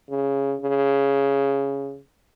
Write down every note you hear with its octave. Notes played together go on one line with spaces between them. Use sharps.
C#3
C#3